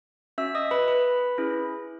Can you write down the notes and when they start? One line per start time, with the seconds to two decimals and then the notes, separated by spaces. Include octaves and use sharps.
0.38 C#4 F#4 E5 E6
0.55 D#5 D#6
0.71 B4 B5
0.88 B4 B5
1.38 C#4 E4 G#4